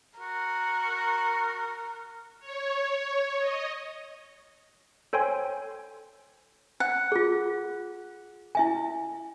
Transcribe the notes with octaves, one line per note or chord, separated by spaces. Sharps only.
F#4 A#4
C#5
D#5
A4 C5 C#5 G5 G#5 C6
F#5
F4 G#4
E4 E5 G#5